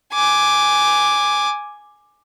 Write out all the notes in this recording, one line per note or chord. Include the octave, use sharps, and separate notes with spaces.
G#5 D6